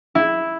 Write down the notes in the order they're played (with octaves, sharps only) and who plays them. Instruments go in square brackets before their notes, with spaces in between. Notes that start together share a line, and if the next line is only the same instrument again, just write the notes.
[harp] E4